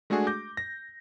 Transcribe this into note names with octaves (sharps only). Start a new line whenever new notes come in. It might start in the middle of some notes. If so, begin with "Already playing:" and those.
G#3 A3 D4 F#4 G#4
D6 G6 A#6
A#6